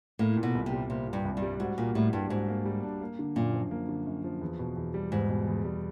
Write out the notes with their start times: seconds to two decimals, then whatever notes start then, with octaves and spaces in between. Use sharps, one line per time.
0.19 A2 A#3
0.37 A#2
0.43 B2
0.55 C2
0.66 C3
0.72 G3
0.90 C3 A#3
1.07 A#2
1.13 G2
1.25 C2
1.37 G2
1.42 G3
1.60 G#2 F#4
1.78 A#2 A#3
1.95 A2 G3
2.13 G2 D4
2.30 G#2 F#4
2.48 A#3
2.66 G3
2.83 D4
3.01 A#3
3.19 D3
3.36 F#2 A#2
3.53 F3
3.71 A#3
3.89 D3
4.07 F#2
4.24 F3
4.41 E2
4.59 B2
4.77 E2
4.94 G3
5.12 E2 G#2
5.29 B2
5.47 E2
5.64 G3